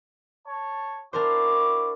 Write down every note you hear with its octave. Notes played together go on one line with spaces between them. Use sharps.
C#5 A5
D4 E4 F#4 A#4 C5 D6